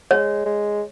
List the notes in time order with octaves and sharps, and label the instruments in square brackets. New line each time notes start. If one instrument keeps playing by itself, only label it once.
[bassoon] G#3 [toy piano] C#5
[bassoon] G#3